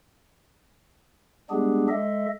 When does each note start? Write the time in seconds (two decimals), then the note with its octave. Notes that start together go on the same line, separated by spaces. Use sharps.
1.50 G3 G#3 B3 D4 G4 G#4
1.89 G#3 A4 D#5 E5